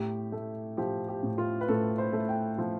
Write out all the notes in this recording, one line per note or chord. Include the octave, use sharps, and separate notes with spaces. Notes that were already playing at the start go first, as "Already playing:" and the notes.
Already playing: A2 G4
A3
F3 G4
G4
A2
F4
B4
A2 A4
C5
A3
G5
F3